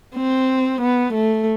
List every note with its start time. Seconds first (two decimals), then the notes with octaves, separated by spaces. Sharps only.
0.16 C4
0.81 B3
1.13 A3